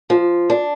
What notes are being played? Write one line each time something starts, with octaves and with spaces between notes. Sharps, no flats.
F3
D4